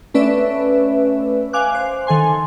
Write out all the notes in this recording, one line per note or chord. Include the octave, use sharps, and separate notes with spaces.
A3 C#4 B4 D5 E5
F5 G#5 D6 F#6
C5
D#3 A4 G#5 C6